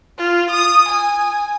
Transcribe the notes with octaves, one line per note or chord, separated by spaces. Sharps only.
F4
D#6
G#5